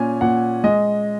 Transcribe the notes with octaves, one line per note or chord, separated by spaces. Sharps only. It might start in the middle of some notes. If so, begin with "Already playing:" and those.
Already playing: A#2 C#4 G#5
A#2 F#5
G#3 D#5